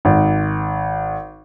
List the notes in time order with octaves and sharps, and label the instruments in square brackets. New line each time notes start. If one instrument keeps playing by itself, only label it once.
[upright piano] G#1